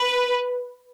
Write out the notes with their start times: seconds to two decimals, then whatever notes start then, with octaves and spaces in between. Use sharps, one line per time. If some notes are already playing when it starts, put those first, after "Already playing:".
Already playing: B4